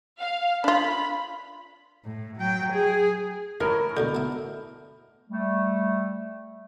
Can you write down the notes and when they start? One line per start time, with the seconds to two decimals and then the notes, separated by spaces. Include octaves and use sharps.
0.20 F5
0.64 D4 F4 B5
2.05 A2
2.37 F#3 G5
2.73 G#4
3.61 A2 E3 A#4
3.97 D2 B2 D3 A4
4.15 B3 E4
5.30 G3 A3